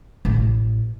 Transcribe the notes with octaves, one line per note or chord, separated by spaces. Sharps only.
A1